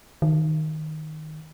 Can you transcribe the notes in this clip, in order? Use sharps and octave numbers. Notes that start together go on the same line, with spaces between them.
D#3